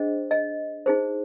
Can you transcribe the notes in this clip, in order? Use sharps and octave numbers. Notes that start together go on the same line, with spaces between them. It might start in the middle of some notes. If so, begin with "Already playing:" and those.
Already playing: D4 G#4 C5 D#5
D#5
D#4 G#4 C5